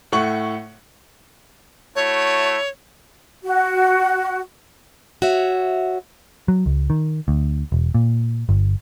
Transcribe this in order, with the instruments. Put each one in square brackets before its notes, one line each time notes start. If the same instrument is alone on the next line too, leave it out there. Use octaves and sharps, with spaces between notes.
[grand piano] A2 A3 F#5 C#6 F#7
[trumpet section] A3 E4 F#4 [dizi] C#5
[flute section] F#4
[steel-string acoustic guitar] F#4 C#5 E5
[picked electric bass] F#3
C#2
D#3
D2
E1
A#2
G1